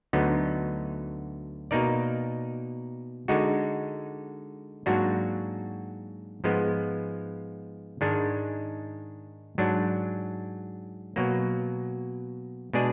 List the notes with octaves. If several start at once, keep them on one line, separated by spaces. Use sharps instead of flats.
D2 D3 F#3 B3 D#4
B2 A#3 D#4 A#4 D5
D3 G#3 D#4 F#4
G#2 F#3 A#3 D4 F#4
G#2 F3 G#3 B3
G#2 D#3 G#3 D4
G#2 F#3 D4
B2 F#3 A#3
B2 G#3 D4 G#4 D5